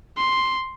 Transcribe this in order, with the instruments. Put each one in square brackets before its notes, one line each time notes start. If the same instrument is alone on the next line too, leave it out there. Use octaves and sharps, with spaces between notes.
[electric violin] C6